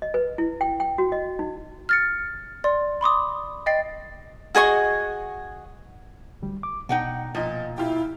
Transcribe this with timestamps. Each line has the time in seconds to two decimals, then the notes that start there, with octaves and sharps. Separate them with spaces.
0.02 D#5
0.14 B4
0.38 E4
0.61 G5
0.80 G5
0.98 F#4
1.12 D#5
1.39 D#4
1.89 F6 A6 C#7
2.64 D5 C6
3.01 B5 C6 D6 D#6
3.66 D#5 G5 A6 C7
4.55 F#4 G#4 D#5 C#6
6.42 D2 G3
6.63 D6
6.89 B2 D#4 F#5 G5
7.35 A#2 F3 D#4
7.78 E4 F4 G4